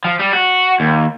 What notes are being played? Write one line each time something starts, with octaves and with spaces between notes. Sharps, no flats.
F3
G3
F#4
D#2